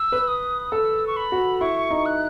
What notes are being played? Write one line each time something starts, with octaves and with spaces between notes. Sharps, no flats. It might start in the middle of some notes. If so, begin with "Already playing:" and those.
Already playing: E6
B4
D#6
A4 E6
C#6
B5
F#4
E4 C#6
D#4
F#6